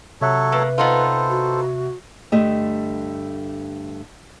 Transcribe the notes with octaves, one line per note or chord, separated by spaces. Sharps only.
C3 F#3 A4 C#5 E5 F#6
A3 A#3 B4
B3 D#4 F4 A4 C5
F#4
G2 D3 G3 A3 G4 D#5